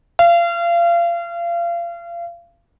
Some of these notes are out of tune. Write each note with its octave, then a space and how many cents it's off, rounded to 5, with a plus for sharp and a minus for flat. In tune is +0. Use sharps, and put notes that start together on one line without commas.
F5 -30